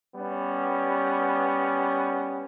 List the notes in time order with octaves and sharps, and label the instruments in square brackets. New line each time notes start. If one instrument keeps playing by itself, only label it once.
[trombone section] G3 B3 C#4